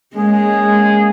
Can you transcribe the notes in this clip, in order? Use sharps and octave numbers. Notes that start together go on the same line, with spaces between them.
G#3 A#3 C#4 G#4 D#5